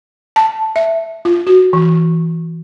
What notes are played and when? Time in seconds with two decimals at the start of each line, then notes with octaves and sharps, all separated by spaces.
0.36 A5
0.76 E5
1.25 F4
1.47 F#4
1.73 E3